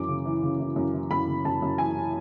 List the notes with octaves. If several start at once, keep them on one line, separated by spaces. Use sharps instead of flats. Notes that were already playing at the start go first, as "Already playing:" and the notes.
Already playing: F#2 E3 D6
C#3
E3
C#3
E3
F#2
E3
F#2 B5
C#3
F#2 A5
F#2
E3 G#5